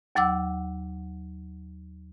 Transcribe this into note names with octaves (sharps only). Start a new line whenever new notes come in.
D#2 F#3 F#5 D6 E6